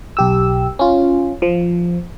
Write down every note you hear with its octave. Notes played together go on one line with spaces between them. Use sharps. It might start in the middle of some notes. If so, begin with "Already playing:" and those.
B1 G4 E6
C#4 F4
F3